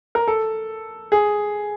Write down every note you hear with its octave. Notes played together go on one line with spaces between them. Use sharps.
A#4
A4
G#4